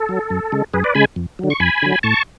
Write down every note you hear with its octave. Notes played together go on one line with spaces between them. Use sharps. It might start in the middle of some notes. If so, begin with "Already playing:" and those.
Already playing: A4
F#3
F#2
C#3 G#3
F#2 G#4 B4
B4 D5
C#3 G#3 G#5 B5
F2
D3 F#3
C#6
F2 G#5 B5
D3 F#3
A2 A5 C#6